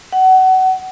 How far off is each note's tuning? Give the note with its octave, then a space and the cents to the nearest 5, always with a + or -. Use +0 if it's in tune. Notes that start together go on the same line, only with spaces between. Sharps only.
F#5 +25